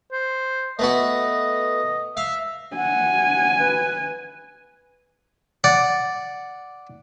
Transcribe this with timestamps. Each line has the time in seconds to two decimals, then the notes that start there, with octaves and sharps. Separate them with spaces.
0.12 C5
0.79 A3 B3 F#4 D#5
2.17 E5 F5
2.76 F#5 G#5
3.59 B4
5.64 D5 F#5